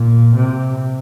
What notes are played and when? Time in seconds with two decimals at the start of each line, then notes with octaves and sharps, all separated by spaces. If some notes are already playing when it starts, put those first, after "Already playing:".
Already playing: A#2
0.36 C3